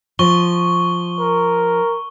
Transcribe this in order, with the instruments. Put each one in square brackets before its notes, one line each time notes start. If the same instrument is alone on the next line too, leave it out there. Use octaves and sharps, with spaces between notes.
[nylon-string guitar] F3 [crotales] C#6 G7
[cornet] A#4